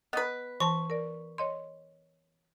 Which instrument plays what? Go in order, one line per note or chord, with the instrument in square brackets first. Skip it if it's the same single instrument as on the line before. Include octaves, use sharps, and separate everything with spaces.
[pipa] B3 B4 [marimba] D#5 D#6
[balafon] E3 A5 [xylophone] C#6
[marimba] A#4 D5
C#5 D#5 C6